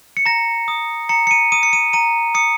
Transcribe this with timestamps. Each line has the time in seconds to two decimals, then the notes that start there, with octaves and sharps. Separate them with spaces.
0.17 C#7
0.26 A#5 A#6
0.68 D#6
1.09 A#5 C#7
1.27 C#7
1.31 D#7
1.52 D#6 D#7
1.63 C#7
1.73 D#7
1.93 A#5 D#7
2.34 D#6 C#7